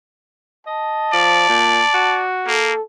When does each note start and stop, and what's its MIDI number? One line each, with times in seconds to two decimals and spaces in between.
0.67 1.09 75
0.67 2.21 81
1.13 1.49 53
1.13 2.27 74
1.49 1.82 46
1.94 2.59 66
2.47 2.73 58
2.47 2.82 69